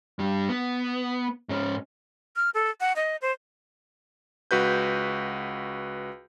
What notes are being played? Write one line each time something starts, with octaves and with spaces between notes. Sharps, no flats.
G2 G3
B3
G#2 C#4
F6
A4
F#5
D#5
C5
C#2 F#4 B4 G6